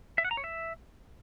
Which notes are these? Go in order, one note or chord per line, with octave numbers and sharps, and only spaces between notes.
E5
F#5
A#5
C#5
E5